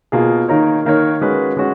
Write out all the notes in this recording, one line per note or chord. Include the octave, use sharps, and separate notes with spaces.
B2 A#3 F4 G#4
D#3 A#3 D#4 A#4 C#5
D#3 A#3 D#4 A#4 C#5
G#3 C#4 F#4 B4
G#3 C#4 F#4